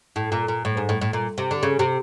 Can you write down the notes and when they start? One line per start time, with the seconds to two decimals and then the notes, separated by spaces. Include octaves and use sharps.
0.16 A2
0.32 A#2
0.48 A#2
0.65 A2
0.77 G#2
0.89 A2
1.01 A2
1.13 A#2
1.38 C3
1.51 D3
1.63 C#3
1.79 C3